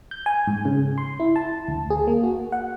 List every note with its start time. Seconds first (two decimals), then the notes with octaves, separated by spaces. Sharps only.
0.11 G6
0.26 G#5
0.47 G#2
0.65 C#3
0.98 C6
1.20 E4
1.36 A5
1.68 D2
1.90 G#4
2.07 A#3
2.23 F#4
2.52 F#5